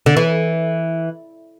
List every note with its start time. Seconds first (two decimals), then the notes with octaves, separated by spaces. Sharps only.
0.06 D3
0.17 E3